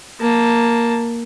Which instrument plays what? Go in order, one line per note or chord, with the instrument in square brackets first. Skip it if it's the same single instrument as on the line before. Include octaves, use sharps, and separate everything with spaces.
[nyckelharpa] A#3 A5